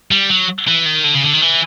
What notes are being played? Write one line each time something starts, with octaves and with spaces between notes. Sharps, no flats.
G3
F#3
E3
D#3
D3
C#3
D3
D#3
E3